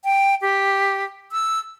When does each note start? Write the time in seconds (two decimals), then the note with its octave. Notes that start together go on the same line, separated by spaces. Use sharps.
0.04 G5
0.41 G4
1.32 E6